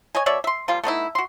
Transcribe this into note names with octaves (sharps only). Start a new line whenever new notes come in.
C#5 D#5 G#5
B2 C#5 D5 E5
E5 C6
F3 G3 A#3 F4
A3 B3 D#4 E4
F#4 C6